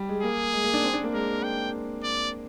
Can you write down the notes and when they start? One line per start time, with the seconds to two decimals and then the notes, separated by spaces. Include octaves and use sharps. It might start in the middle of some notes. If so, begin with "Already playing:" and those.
Already playing: G3
0.09 G#3
0.23 A#3 G#4
0.53 G#3
0.64 A#3
0.74 D4
0.84 C4
0.94 D4
1.04 A#3
1.14 G#3 A#4
1.44 G5
2.03 D5